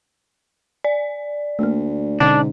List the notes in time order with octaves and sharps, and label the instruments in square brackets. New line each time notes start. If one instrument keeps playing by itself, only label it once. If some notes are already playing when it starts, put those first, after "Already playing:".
[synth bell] D5
[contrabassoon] D2 [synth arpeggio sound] A3 A#3
[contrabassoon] G#2 [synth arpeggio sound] B2 D3 C#4 [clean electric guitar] D4